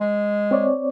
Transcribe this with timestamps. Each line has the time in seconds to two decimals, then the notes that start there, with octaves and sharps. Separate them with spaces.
0.01 G#3
0.51 C4 C#5 D5